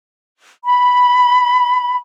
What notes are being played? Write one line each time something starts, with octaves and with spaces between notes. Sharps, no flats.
B5